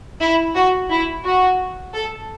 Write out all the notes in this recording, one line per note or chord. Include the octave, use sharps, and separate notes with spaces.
E4
F#4
E4
F#4
A4